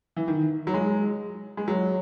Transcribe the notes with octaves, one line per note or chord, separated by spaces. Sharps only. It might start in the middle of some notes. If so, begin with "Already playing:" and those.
E3
D#3
F#3
G#3
G#3
F#3